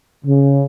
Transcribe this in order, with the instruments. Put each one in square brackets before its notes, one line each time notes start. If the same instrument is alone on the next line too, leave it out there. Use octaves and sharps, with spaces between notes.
[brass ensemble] C#3